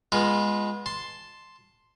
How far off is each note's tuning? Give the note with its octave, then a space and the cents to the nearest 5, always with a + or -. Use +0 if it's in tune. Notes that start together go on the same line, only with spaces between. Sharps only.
G#3 -10 B3 -20 F4 +0
A5 +0 C6 +0